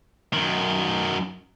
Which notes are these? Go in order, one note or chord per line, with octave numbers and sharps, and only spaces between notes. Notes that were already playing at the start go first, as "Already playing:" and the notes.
F#2 D#3